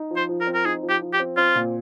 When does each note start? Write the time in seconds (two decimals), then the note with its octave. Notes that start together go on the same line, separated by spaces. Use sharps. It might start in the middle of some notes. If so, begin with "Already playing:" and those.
Already playing: D#4
0.11 F3
0.16 C5
0.29 F3
0.41 A#4
0.47 C4
0.54 A#4
0.65 D#4 G#4
0.83 F3
0.89 G4
1.02 F3
1.13 G4
1.19 C4
1.37 C4 F4
1.55 A#2